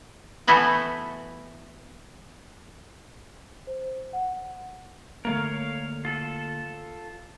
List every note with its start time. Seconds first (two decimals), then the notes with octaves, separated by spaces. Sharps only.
0.47 E3 A3 B3 E4 F#4 B4
3.67 C5
4.13 F#5
5.25 D3 A3 A#3 A#4 C#5 F5
6.05 F4 A4